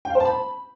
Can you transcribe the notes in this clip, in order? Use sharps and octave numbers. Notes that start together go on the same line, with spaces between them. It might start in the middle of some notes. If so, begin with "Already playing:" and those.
G5
F5
C5
A5
B5